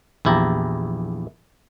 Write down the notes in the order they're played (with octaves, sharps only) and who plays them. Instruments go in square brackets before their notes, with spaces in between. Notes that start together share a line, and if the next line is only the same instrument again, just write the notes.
[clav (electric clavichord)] A#1 E2 E4 G4 A5 A#5